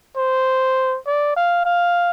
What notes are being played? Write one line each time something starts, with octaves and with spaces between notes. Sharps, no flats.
C5
D5
F5
F5